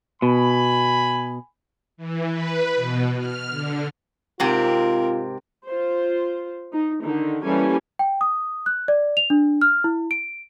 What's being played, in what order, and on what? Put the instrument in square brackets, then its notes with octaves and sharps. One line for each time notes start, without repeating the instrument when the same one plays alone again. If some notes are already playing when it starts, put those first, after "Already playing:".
[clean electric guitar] B2 [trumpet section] G#5 B5
[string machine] E3
B4
B2
F6
D3
[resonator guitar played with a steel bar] G#2 C3 G4 [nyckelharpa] C4 A#4 [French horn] F4
[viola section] F4 C5
D#4
D3 D#3 D#4
E3 G3 A#3 C#4 A4 G#5
[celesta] G5
D#6
F#6
D5
F7
D4
F6
E4
D7